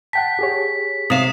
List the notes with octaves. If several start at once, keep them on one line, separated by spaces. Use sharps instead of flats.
F#5 G5 A5 B6
G4 G#4 C#5
C3 F5 D#6 E7